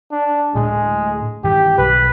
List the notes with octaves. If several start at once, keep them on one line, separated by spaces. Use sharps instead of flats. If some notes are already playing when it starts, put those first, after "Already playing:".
D4
D2 A2 G#3 D4
G2 D#3 E3 G4
B1 B4